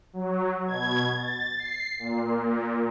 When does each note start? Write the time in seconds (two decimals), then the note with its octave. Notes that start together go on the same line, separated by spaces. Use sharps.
0.13 F#3
0.67 B2 G#6
1.16 A6
1.58 C7
1.99 A#2